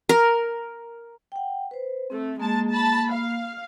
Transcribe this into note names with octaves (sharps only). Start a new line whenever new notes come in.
A#4
F#5 G5
B4 C5
A3 C4
G#3 A#3 A5
A5 B5
F5